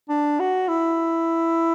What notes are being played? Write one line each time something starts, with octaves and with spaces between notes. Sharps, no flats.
D4
F#4
E4